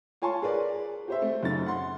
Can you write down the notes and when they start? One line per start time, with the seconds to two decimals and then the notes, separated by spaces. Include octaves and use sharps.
0.22 F4 C#5 G#5 A5 C6 C#6
0.42 G#4 A#4 B4 D5
1.08 G4 C5 E5
1.22 A3 C4
1.43 F#2 C#3 D#4 A6
1.66 F#5 C6